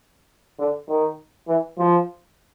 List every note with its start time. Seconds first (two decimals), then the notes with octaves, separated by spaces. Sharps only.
0.59 D3
0.89 D#3
1.48 E3
1.78 F3